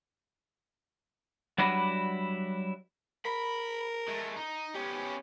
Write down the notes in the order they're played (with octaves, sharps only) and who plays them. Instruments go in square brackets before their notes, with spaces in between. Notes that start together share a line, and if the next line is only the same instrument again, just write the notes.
[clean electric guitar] F#3 G3 D4 E4 F#4 B4
[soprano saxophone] A#4 [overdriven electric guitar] B5
[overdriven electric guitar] G#3 A3
D#4
[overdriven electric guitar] B3 C#4 [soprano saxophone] G4